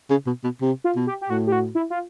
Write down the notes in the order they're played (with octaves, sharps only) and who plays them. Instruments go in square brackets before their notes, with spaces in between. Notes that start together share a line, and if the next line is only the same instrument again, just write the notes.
[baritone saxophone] C#3
B2
B2
C3
[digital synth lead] F4
[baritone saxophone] B2
[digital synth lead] G4
G4
[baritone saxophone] A2 [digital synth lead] F#4
[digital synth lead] G4
F#4
E4
F4